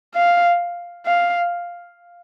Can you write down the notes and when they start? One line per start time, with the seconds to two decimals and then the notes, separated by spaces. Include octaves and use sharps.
0.15 F5
1.06 F5